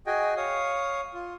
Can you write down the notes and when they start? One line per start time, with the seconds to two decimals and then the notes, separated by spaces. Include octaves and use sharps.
0.07 F#4 G#4 D#5 G5 G#5
0.37 C#5 F5 D#6
1.14 F4